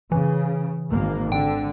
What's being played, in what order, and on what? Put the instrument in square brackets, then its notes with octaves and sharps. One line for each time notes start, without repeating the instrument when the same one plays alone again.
[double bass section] C#3 [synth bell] E3
[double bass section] G#1 A#3
[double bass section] D3 [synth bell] G5